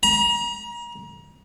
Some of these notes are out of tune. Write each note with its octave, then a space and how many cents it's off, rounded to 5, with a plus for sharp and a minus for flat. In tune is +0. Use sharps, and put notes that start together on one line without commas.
A#5 +35